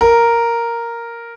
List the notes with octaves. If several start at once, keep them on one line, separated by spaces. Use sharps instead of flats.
A#4